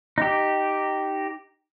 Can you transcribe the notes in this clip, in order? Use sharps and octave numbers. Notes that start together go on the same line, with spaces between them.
D#4 G4